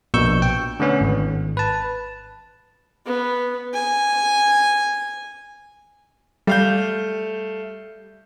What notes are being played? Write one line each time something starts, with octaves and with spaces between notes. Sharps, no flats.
A#1 B2 C#6 E6 G6
G5
D3 A3 B3 C#4
G#1
B4 A5
B3
G#5
G3 A3 F5 G6